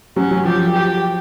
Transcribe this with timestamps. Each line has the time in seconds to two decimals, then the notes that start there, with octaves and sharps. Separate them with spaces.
0.16 F#3 C#4
0.31 F#3
0.45 F3 G4
0.75 G4